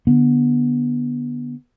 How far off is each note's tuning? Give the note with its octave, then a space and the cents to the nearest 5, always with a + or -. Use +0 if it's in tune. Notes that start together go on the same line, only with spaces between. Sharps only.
D3 +0 B3 -20